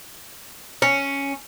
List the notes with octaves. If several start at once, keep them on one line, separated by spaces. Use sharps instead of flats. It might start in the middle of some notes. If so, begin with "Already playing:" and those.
C#4